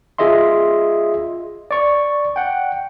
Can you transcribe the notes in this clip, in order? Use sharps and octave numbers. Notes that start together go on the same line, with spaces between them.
F4 G#4 D#5 E5 C6
D5 C#6
F#5 G5